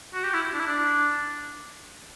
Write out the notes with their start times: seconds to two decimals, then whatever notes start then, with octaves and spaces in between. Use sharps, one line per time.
0.14 F#4
0.23 G4
0.34 E4
0.53 D4
0.59 E4
0.67 D4